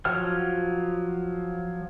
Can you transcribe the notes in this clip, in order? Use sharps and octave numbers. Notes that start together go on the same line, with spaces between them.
F3 F#3 C#5 F#5 F6